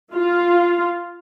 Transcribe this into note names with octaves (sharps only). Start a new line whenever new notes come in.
F4